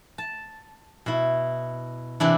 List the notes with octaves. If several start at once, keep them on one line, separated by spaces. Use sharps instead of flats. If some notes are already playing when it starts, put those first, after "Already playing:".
A5
B2 E4
C3 E3 D4 E4